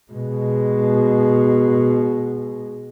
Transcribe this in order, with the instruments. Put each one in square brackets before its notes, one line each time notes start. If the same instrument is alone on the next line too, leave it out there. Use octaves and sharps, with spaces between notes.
[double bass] B2 G#3